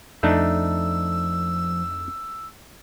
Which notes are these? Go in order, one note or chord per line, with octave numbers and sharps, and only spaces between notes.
F2 F3 A3 D4 D#4 E6